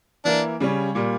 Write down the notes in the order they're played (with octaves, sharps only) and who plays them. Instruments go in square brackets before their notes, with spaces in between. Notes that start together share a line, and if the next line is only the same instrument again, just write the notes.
[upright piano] E3 A#3 E4 A#4 [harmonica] D4
[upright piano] C#3 G3 C#4
A#2 G3 A#3